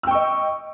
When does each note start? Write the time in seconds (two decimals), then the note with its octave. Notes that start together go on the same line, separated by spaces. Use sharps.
0.03 E6
0.07 G5
0.11 C#6
0.15 D#5